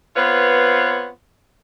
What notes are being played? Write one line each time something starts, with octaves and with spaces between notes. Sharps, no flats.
B3 C4 F4 B4 C#5